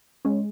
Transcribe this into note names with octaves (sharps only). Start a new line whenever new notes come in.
G#3 C#4